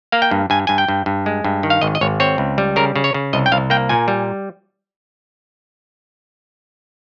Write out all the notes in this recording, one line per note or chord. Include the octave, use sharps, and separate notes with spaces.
A#3 F5
G5
G2
G2 G#5
G2 G#5
G5
G2
G2
G#3
G2
D#3
F5
G#1 D#5
D#5
G#1 C#5
C4 C#5
C#2
G3
C#3 A#4
C#3
C#5
C#3
C2 D#5
G5
C2 F5
A#3 G5
A#2 G#5
G3